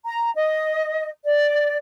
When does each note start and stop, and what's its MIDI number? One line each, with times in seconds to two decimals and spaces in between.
0.04 0.30 82
0.34 1.09 75
1.24 1.76 74